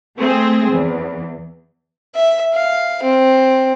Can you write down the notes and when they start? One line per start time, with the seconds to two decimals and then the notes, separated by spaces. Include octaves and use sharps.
0.19 A3 C4 G#4
0.71 E2
2.16 E5
2.54 F5
3.03 C4